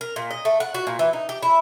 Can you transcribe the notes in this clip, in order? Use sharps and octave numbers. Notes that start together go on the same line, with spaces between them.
A#4
A#2
D#5
A3
F#5
F#4
A#2
E3
D#4
G4
E4